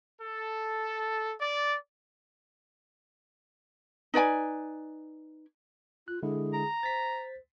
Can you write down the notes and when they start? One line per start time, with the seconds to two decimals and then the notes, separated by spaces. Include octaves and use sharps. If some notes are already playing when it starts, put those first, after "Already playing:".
0.21 A4
1.41 D5
4.14 D#4 B4 D5 G#5
6.08 F4 F#6
6.23 D3 G#3 E4 G#4
6.54 A#5
6.83 C5 A6 B6